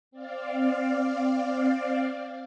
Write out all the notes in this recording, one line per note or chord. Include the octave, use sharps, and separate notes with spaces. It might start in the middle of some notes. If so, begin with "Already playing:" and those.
C4 D5 F5